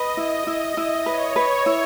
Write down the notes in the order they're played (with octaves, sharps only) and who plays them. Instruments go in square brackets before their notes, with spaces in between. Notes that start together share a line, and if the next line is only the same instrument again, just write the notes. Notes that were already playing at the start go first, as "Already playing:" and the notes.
Already playing: [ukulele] B4 [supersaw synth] D#5
[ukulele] E4
E4
E4
[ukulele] B4 [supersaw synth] C#5
[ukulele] B4
E4